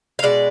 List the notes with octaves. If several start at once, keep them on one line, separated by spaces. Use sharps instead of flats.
F5
B2 G#3 D5